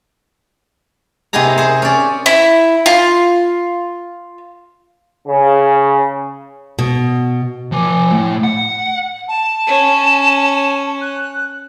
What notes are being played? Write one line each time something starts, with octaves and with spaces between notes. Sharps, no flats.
C3 B3 D#4 G4 G#4 A#5
G#4 C5
C#4 D5
E4
F4
C#3
B2
F3 G#5
A2 A3
F#5
A5
C#4
F#6